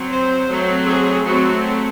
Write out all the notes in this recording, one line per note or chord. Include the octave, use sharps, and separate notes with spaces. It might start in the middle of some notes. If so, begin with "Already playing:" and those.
Already playing: F#3 C4
C5
F#3 A3 C4
G#4
F#3 A3 C4 F#4